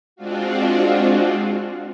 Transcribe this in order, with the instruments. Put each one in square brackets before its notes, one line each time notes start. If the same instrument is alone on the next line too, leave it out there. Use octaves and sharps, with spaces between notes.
[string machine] G#3 C4 D4 F4 F#4